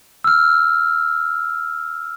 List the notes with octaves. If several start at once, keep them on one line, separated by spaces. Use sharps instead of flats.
E6 F6